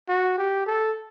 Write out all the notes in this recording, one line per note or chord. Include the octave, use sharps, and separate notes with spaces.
F#4
G4
A4